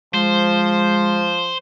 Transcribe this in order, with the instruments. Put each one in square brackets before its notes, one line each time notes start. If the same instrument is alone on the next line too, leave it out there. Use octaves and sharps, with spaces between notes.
[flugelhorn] F3 [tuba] G#3 [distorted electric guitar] C5